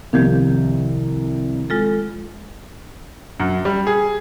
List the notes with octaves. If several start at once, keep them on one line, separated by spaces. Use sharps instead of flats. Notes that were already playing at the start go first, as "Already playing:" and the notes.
C2 D#3 F3 G4
G#3 F4 A4
F#2
G3
G#4